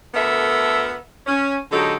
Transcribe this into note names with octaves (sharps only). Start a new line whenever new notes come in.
D2 B3 A4 A#4 E5
C#4
D3 F#3 G#3 D#4 G4 A4